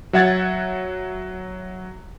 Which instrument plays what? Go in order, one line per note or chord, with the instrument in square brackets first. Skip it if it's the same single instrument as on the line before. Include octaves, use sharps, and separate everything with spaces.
[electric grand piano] F#3 E5 F#5 G#6 A6